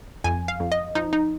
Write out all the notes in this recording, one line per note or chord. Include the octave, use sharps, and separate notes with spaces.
F2 G#5
F5
F2
D#5
F3 D#4
D#4